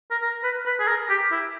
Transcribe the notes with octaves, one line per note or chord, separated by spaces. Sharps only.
A#4
A#4
B4
B4
G#4
A#4
G4
E4